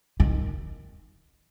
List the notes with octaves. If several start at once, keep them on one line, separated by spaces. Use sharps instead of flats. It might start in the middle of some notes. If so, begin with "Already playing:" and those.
D#3